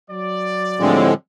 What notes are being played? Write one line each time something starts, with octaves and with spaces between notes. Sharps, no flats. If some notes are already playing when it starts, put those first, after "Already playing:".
F#3 D5
A2 D3 F3 G3 G#3 C4